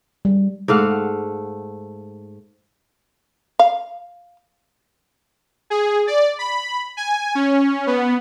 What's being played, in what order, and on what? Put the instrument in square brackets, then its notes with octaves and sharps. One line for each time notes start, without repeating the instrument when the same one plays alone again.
[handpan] G3
[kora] G#2 A3 F5 F#5
[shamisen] F5
[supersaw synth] G#4
D5
B5
G#5
C#4
B3